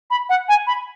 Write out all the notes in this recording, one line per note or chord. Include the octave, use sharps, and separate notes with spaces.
B5
F#5
G#5
B5